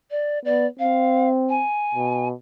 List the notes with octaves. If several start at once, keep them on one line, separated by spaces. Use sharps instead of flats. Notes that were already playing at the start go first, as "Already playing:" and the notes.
D5
B3 D5
C4 F5
G#5
B2